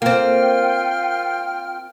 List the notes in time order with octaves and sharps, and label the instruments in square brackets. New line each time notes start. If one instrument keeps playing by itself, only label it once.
[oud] A#3 C4 [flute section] F4 G5 F6